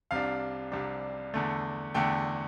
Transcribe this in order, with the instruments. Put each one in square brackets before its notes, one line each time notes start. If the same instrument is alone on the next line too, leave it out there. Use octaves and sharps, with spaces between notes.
[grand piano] C2 C3 G3 D4 F5
C2 C3 G3 D4
E2 D3 A3
E2 D3 A3 G5